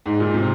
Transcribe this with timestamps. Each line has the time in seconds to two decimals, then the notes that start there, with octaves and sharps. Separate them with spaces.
0.06 G#2
0.20 A#2
0.34 C3